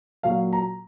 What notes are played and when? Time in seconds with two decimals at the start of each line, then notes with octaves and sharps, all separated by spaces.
0.23 A#2 F#3 F5
0.53 A#5